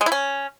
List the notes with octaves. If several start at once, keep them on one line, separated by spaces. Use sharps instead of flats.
G#3
E4
C#4